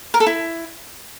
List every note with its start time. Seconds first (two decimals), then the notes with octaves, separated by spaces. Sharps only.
0.14 A#4
0.20 A4
0.27 E4